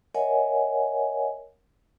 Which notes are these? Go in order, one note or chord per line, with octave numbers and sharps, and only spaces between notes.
A#4 C#5 D#5 E5 F#5 G#5